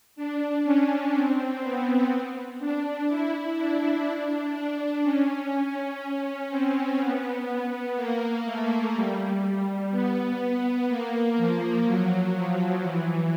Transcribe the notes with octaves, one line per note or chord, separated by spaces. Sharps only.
D4
C#4
C4
B3
D4
E4
D4
D4
C#4
C4
B3
A#3
A3
G3
G3
B3
B3
A#3
F3
F#3
F3
E3